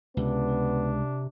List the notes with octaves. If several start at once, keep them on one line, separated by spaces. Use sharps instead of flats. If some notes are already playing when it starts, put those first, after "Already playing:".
C#2 C3 B3 D4